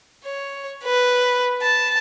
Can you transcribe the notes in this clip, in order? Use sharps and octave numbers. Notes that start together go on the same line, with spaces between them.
C#5
B4
A5